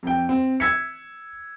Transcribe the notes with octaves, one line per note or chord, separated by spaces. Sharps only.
F2 G5
C4
E6 G#6 B6 C#7